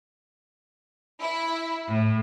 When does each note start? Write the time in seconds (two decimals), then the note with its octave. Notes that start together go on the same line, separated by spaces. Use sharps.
1.21 E4
1.89 A2